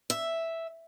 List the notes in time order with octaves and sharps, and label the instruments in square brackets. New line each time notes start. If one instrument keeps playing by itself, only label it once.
[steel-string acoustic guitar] E5